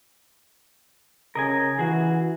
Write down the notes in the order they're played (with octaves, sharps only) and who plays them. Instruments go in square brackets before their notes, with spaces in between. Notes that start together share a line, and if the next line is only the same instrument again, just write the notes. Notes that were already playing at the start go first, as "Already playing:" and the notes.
[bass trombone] C#3 [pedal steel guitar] A#4 D#5 G#5
[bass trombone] E3 [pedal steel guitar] F#4 G#4